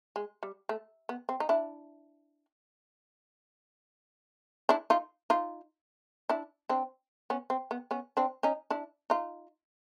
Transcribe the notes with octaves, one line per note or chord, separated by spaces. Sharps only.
G#3
G3
A3
B3
C4
D#4
D4 E4
D4 E4
D#4 F4
D#4 F4
D4 E4
C4 D4
B3 C#4
C4
B3
B3 C#4
C4 D4
C#4 D#4
D4 E4
D#4 F4